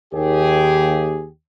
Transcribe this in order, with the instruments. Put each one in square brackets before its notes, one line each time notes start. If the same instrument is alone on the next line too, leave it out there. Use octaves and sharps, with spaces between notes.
[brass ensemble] D#2 G4 G#4